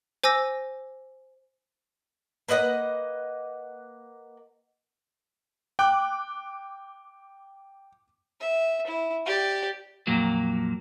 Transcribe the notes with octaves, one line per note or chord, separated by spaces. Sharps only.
C5 G#5 D6 E6 A#6
A#3 B4 D#5 F#5
G5 D6 F#6
E5
E4
G4 D5
F2 A#2 F#3 A#3